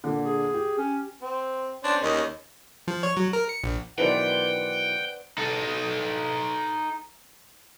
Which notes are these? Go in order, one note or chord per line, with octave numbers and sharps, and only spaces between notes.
A#2 D3
G#4
G4
C#4
C4
C#4 D4 C5
D#2 C#4 D#4
F3
C#5
F#3
A#4
C#7
A#1
B1 D#3 E3 B4 C5 D5 F#5 G5
D#4 A4